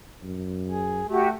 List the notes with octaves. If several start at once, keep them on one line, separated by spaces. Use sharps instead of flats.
F#2
G#4
A3 F#4 G4